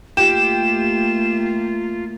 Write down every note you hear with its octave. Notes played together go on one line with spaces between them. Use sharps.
A3 A#3 F4 G4 E7